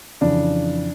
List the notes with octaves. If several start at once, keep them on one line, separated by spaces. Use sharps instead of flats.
F2 C#3 E3 D4